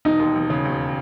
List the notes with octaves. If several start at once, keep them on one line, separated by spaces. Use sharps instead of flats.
E1 D#4
D#2
E1
C#3
E1